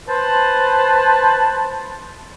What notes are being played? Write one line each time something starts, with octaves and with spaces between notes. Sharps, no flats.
B4 C5 A5